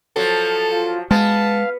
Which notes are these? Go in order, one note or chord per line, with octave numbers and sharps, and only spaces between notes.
F3 F#3 A4
F4
G#3 B3 F5 A5